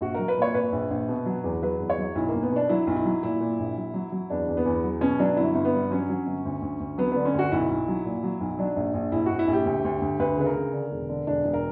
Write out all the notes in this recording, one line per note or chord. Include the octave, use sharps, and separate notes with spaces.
A#1 F#4
F#3 A#4
B4
A#2 C#5
A#2 B4
A#1
A#1
B2
F#3
E2
F#3 B4
E2
C#5
F#3
B1 E4
A#3
B1
B3
B2 D4
F#3 E4
B1
E4
F#3
A#2 E4
A#2
A#1
F#3
F#3
F#3
E2 D4
E2
B3
E2
F#3
B2 C#4
F#3 D4
G1 E4
G1
B3
G2
F#3 C#4
F#3
G1
D2
D2
D2
F#3 B3
D3 B3
C#4
D2 F#4
B1 E4
B1
F#3
A#2
F#3
B1
F#3 D4
A#1
A#1
A#1 E4
A#1 F#4
E4
A#1
G4
D2
D2
D2
D2 B4
C#3 B4
A#4
C#3
D3
E1
D3
E1 D4
E1
A#4